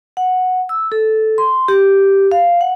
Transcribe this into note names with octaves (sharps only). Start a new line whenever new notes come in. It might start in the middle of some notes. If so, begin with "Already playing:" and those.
F#5
E6
A4
C6
G4
F5
F#5